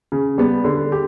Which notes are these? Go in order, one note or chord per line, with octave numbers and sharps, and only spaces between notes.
C#3
G3 B3
D3
G4